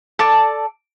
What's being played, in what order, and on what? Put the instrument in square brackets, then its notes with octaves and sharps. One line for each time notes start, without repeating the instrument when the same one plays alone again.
[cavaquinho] A4 D5 A5